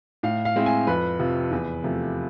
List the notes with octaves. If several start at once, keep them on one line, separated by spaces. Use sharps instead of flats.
A2 F5
F5
G#3 C4 E4
G#5
F2 B4
C3 F3
E2
C3 F3 A3